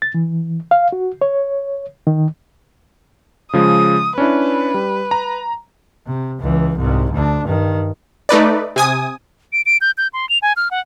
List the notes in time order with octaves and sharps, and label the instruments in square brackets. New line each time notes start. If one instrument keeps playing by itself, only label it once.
[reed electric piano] A6
E3
F5
F#4
C#5
D#3
[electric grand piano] C#3 F3 G#3 [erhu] D#6
[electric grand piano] C#4 D4 E4 [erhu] B4
[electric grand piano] G3
A#5
[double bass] C3
C#2 E3
C2 G#2
D2 D4
G2 D#3
[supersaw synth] A3 D#4 B4 D5
C3 G#5 D#6
[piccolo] D7
D7
G6
G6
C6
F7
G#5
F6
F#5